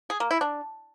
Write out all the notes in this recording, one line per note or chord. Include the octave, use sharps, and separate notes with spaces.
G#4
A#3
E4
D4